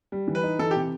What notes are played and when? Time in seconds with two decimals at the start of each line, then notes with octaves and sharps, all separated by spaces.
0.12 G3
0.28 E3
0.35 B4
0.43 D#4
0.59 E3 A4
0.71 G4
0.76 C3